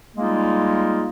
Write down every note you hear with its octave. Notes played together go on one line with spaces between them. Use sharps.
G3 G#3 A#3 D#4 F4 G#4